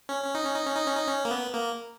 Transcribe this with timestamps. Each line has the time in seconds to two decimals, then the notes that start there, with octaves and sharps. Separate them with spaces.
0.09 C#4
0.24 C#4
0.35 D#4
0.45 C#4
0.55 D#4
0.66 C#4
0.76 D#4
0.87 C#4
0.97 D#4
1.08 C#4
1.25 A#3
1.31 B3
1.54 A#3